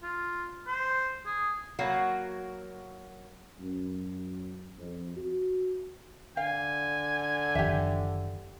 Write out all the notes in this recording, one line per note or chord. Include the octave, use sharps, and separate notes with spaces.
F4
C5
G#4
F#3 A#3 F#4
F#2
F2
F#4
D3 F5 G#5
F#1 D#3 F3 G4 E5